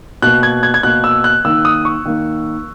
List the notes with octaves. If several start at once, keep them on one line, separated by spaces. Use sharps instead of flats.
B2 A#3 F#6
G#6
G#6
G#6
B2 A#3 F#6
E6
F#6
D#3 A#3 E6
D#6
C#6
D#3 A#3